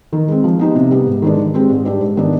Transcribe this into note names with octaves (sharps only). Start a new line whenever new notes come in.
D#3
G#3 C4
F3
B3 D#4 G4
C3
G3 B3
G#2
D#3 G#3 D4
D#3
G#3 C4 G4
G#2
G3 D4 G4
G#2
D#3 B3 D4